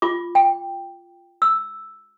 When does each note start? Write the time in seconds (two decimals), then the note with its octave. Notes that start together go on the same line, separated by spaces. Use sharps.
0.02 F4 D6
0.35 G5
1.42 E6